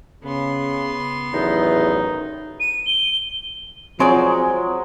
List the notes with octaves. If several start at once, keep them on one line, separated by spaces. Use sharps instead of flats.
C#3 B3 C6
A1 E2 D#3 F#3 D#4
D#7
G7
F3 F#3 G#3 C4 C#5 D5